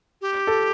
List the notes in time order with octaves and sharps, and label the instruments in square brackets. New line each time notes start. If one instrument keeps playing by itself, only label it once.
[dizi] G4
[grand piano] A4